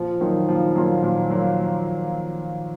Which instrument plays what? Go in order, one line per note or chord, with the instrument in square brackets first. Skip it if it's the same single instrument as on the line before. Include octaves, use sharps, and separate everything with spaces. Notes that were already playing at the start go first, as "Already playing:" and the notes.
Already playing: [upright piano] A#2 [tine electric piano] F3
[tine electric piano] D#3 [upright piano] F#3 A#3 F4
[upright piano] A#2 [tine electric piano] F3
[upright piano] F#3 A#3 F4
A#2
F#3 A#3 F4